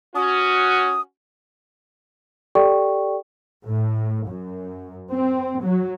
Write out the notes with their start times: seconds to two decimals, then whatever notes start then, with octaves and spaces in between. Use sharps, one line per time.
0.15 C#4 F#4 D#6
2.55 G4 A4 D5 G5 C#6
3.66 A2
4.28 F#2
5.11 C4
5.64 F#3